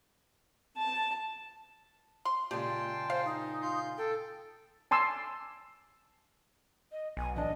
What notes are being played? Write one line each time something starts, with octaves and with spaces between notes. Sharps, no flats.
A5
C6
A#2 C#3 G#3 G4 G5 A5 C6
C5 F5
D#4
F4 C6 G6
A4 G5
G#5 A5 C6 D6 E6
D#5
B1 G#5
A1 D4 D#5